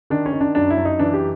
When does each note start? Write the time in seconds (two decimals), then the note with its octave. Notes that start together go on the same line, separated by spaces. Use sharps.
0.10 D#3 D4
0.26 C#4
0.33 D#3
0.41 D4
0.55 F#2 D4
0.70 E4
0.77 F#2
0.85 D#4
0.99 E3 D4
1.14 G4